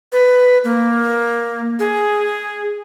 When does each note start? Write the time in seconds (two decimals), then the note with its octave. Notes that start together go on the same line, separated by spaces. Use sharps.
0.12 B4
0.64 A#3
1.79 G#4